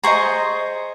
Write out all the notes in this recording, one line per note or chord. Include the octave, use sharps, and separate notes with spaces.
G#4 C5 D#5 A#5 C#6